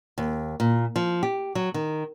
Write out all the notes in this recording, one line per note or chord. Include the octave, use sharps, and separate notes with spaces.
D#2
A#2
F3
G4
F#3
D#3